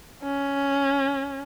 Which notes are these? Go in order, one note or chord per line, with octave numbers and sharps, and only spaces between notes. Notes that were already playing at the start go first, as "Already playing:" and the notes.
C#4